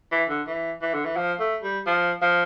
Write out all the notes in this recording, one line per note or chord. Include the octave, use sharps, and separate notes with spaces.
E3
D3
E3
E3
D3
E3
F3
A3
G3
F3
F3